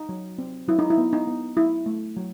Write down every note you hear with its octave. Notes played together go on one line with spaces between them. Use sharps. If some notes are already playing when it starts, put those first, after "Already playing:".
Already playing: D#4
F#3
C4
F#3 E4
D#4
E4
B3
D#4
B3
F#3 E4
A3
F#3